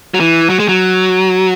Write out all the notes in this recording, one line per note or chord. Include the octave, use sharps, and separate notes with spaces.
F#3
E3
F#3
G#3
F#3